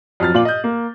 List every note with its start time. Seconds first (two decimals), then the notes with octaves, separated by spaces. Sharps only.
0.20 F2 F#3 F6 A6
0.34 A#2 F4 D5 F#7
0.45 D#5 G6
0.64 A#3